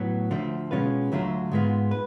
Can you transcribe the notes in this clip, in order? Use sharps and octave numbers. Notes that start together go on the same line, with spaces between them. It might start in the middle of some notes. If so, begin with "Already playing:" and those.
Already playing: A2 F#3 B3
D2 D3 F3 A3
B2 G#3 C#4 F4 B4
D2 D3 F#3 A3 F4
G#2 G#3 B3 F4
B4